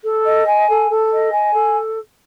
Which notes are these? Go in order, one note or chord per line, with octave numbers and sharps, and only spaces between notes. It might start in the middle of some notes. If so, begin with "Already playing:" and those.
A4
D#5
G#5
A4
A4
D#5
G#5
A4